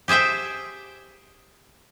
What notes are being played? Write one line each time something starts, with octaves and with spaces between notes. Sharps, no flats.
G4 G#4 C5 E5 G5